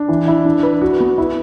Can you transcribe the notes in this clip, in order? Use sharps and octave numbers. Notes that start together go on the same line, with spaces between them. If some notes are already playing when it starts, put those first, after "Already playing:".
Already playing: D4
E3
E4
D4
B4
F#4
B3
E4